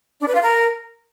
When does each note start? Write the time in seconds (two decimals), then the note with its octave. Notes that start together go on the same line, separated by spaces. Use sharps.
0.21 D4
0.28 B4
0.34 F4
0.41 A#4